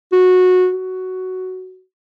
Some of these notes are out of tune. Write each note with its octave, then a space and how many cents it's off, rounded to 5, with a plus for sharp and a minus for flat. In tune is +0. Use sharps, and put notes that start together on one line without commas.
F#4 -15
F#4 +5